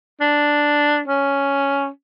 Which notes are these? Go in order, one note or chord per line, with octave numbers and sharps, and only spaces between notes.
D4
C#4